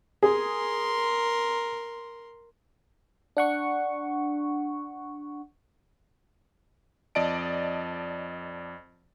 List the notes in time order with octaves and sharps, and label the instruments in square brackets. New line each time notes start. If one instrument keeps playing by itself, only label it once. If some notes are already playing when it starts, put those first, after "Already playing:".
[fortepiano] G#4 [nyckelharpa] A#4 C6
[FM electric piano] D4 F#5 C#6
[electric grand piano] F2 D5 D#5 A5 D7